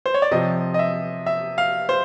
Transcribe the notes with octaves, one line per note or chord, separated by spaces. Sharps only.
C5
C#5
D5
C3 F3 D#5
D#5
E5
E5
F5
C5